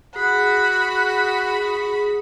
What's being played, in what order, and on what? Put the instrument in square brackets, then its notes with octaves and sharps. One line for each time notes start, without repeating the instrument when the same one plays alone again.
[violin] F#4 B5 [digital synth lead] G#4 [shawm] F#5